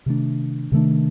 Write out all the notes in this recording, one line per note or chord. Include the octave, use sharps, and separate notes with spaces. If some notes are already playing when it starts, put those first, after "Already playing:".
C3 D#3 A3 D4
C3 D#3 A3 D4